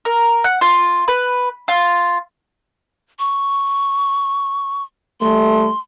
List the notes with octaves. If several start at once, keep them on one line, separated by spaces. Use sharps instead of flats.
A#4
F#5
F4
B4
F4
C#6
D#2 G3 A3 C6